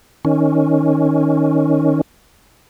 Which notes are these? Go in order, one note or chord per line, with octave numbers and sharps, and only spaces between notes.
D#3 C#4